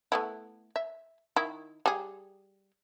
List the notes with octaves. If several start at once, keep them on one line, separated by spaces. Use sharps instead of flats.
A3 B3 E4
E5
D#3 E4
G3 G#4